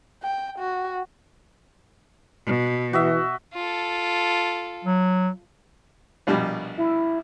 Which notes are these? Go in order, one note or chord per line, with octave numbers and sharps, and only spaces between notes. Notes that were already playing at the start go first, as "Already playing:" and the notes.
G5
F#4
B2
E3 F#4 D#5 E5
F4 A4
F#3
A#1 B2 G3
E4